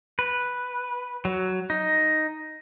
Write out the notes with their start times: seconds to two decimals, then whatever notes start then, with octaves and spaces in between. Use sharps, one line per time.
0.19 B4
1.25 F#3
1.70 D#4